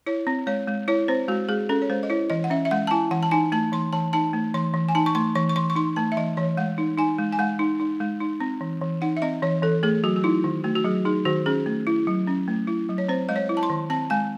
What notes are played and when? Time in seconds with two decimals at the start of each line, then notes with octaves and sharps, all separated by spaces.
0.06 E4 C#5
0.27 C4
0.47 G#3 C#5
0.68 G#3
0.88 E4 C#5
1.08 C4 C5
1.28 G#3 F#4
1.49 G#3 G#4
1.69 C#4 A4
1.82 C#5
1.89 G#3 C5
2.03 D#5
2.10 E4 C#5
2.30 E3 D#5
2.44 F#5
2.50 C#4 E5
2.65 E5
2.71 G#3 F#5
2.87 A5
2.91 E4 G#5
3.11 E3 F#5
3.23 A5
3.31 D#4 G#5
3.52 A3 A5
3.72 E3 C6
3.93 E3 A5
4.13 D#4 A5
4.33 A3
4.54 E3 C6
4.74 E3
4.89 G#5
4.95 D#4 A5
5.06 C#6
5.15 A3 C6
5.35 E3 C#6
5.49 C#6
5.56 E3 C6
5.70 C#6
5.76 D#4 C6
5.96 A3 A5
6.12 E5
6.17 E3 D#5
6.37 E3 C#5
6.57 G#3 F#5
6.78 D#4
6.98 D#4 G#5
7.18 G#3
7.32 G#5
7.39 G#3 F#5
7.59 D#4
7.80 D#4
8.00 G#3
8.20 D#4
8.40 C4
8.61 E3
8.81 E3
9.02 D#4 F#5
9.17 E5
9.22 C4 D#5
9.42 E3 C#5
9.62 E3 A4
9.83 A3 G#4
10.04 F#3 F#4
10.16 F#4
10.24 D#4 E4
10.44 D#3
10.64 A3 F#4
10.76 F#4
10.85 F#3 G#4
11.05 D#4 G#4
11.25 D#3 F#4
11.46 C#4 G#4
11.66 A3
11.87 E4
12.07 F#3
12.27 C#4
12.48 A3
12.67 E4
12.89 F#3
12.98 C#5
13.09 C4 C5
13.29 G#3 D#5
13.36 C#5
13.49 E4
13.57 A5
13.63 C6
13.70 D#3
13.90 C4 A5
14.10 G#3 G#5